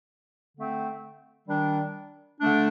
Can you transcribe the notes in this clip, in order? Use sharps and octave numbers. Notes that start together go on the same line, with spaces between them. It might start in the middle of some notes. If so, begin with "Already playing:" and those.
D3 A3 C4
D#3 G3 D4
D3 A3 D4